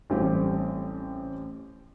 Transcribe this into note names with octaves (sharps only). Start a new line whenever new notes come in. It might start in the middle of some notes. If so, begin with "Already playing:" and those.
A1 G3 C4 G4